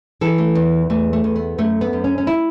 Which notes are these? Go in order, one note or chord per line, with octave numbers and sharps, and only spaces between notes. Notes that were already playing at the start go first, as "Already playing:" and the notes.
E3 A4
A3
E2
E2 A3
A3
E2
B3
F#2 A3
B3
F#2
C#4
C#4
E4